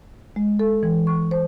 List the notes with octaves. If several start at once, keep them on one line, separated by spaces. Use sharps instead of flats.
G#3
A4
E3
C#6
C5